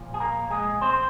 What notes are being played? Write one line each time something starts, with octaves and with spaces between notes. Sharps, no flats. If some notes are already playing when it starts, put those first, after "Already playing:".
Already playing: A#2 F3
G#4
A#3 A#4
G#3 G#4
C4 C5